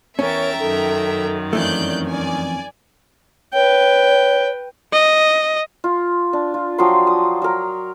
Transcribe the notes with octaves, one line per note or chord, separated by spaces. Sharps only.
E2 C#4 A#4 C#5 E5 G5 A#5 A6
F#2 D#3 A4
F2 E3 A3 C#4 D5 F#6 G6
D5 G#5
B4 C#5 G5
D#5
F4
D4
F4
F3 F#3 G5 C6
D#6
F#3 A#4